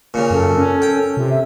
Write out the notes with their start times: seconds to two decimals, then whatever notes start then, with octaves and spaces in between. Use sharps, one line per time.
0.14 A#2 C#3
0.31 F#2 A4
0.58 C#4
0.82 G5
1.17 C3 F4
1.29 E5